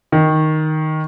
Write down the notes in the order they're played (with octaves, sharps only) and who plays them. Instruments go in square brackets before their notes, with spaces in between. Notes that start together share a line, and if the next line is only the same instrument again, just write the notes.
[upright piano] D#3